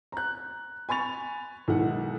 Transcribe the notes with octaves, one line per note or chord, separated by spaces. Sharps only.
A#5 F#6
G#5 B5 C#6 A6 F7
B1 D#3 G#3 E4 A4 F#5